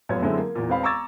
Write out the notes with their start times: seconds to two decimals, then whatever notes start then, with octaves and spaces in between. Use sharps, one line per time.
0.09 F1 F#2 B3 F4 C#5 G#6
0.22 F#2 D3 G#3 A3 C4 E4
0.38 A#3
0.55 E2 A#2
0.69 E1 B3 C4 F5 B5
0.83 A#5 C#6 D6 E6 G#6 A6